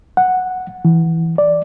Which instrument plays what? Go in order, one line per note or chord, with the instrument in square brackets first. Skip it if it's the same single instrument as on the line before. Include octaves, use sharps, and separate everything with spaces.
[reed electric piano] F#5
E3
D5